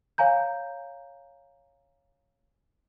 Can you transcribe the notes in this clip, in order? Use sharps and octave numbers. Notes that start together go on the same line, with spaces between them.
C#5 F5 G#5 A#5 G6